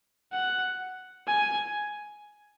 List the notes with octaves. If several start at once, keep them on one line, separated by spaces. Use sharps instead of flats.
F#5
G#5